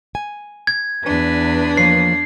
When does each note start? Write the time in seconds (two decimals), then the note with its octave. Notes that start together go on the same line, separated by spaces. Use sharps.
0.15 G#5
0.67 G#6
1.06 E2 D4 B4
1.77 F3 A#3 C#5 C7